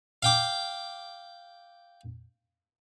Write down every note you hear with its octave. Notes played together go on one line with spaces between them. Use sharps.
F5 G5 D6